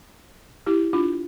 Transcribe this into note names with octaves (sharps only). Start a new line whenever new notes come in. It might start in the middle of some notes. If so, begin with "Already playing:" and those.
E4 G4
D4 F4